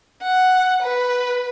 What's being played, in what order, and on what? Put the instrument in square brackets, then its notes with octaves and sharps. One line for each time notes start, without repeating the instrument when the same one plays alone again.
[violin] F#5
B4